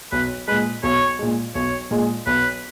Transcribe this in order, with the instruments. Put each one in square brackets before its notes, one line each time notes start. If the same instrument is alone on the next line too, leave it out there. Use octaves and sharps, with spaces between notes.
[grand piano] B1 [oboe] B4
[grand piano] A#2 G#3 [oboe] B4
[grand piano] B1 [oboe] C#5
[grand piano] A#2 G#3
[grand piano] B1 [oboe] C#5
[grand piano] A#2 G#3
[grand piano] B1 [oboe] B4